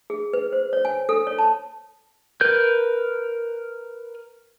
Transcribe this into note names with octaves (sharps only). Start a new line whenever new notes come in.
G#4
B4
C5
C#5
G#5
A4
C#5
A5
A#4 B4 G6